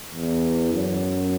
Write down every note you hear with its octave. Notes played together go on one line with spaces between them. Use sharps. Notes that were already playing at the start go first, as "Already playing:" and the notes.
E2
F#2